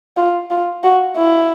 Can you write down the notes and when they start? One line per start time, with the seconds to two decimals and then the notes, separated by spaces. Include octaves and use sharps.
0.17 F4
0.51 F4
0.84 F#4
1.17 E4